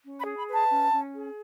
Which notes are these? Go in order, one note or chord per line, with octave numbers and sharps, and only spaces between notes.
C#4
B5
G#4
B5
B4
A5
C#4
C#4
G#4